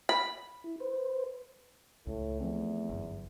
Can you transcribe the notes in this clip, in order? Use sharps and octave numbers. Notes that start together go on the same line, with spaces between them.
B5
E4
B4 C5
C#2 A2
E2 F3 A3 C4
G1 F#2